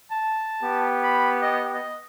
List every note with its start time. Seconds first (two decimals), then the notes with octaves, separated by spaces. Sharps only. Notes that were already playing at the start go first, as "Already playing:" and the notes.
0.11 A5
0.62 B3 G4
1.03 B5
1.42 D#5
1.74 D#5